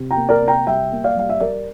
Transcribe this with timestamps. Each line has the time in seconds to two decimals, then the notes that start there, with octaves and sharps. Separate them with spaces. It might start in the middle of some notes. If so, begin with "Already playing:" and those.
Already playing: C3
0.11 G5 A#5
0.16 A#3
0.29 A#4 D5
0.41 C3
0.48 G5 A#5
0.67 G3 E5 G5
0.92 A#3
1.04 D5 F5
1.16 G3 F5
1.29 E5
1.40 G3 A#4 D5